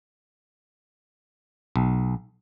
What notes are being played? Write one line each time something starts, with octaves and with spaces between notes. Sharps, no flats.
B1